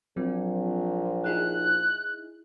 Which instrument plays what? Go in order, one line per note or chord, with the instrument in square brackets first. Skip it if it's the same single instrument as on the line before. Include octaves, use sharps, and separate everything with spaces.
[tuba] A#1 [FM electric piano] F#3 C4
[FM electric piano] D#4 E4 G#4 [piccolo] F#6